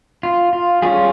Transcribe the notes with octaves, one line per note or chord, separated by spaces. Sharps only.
F4
F4
G3 C#4 F4 G#4